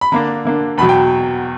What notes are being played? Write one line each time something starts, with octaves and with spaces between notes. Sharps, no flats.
B5
D3 A#3 D4 A#5
D3 A#3 D4
E2 B2 F#3 B5
G5